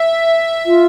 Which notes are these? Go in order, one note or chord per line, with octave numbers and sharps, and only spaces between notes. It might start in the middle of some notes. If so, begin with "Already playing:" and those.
Already playing: E5
F4